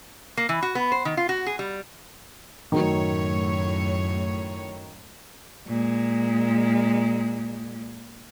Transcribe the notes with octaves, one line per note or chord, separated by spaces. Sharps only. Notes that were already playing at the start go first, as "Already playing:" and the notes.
A#3
E3
F#4
B3
C5
D#3
F4
F#4
G#4
G3
F#2 A2 D#3 F#3 C#5
A#2 G#3